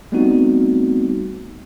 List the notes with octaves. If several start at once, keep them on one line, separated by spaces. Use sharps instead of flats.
G3 A3 B3 C4 D#4 F#4